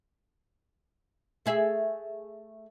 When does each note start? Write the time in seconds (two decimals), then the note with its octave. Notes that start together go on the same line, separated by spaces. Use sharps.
1.46 A3 G#4 E5